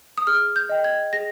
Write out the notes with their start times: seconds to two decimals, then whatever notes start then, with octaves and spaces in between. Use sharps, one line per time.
0.18 D#6
0.27 G#4 F6
0.56 G6
0.69 D#5 G5
0.84 G#6
1.13 G#4 A#6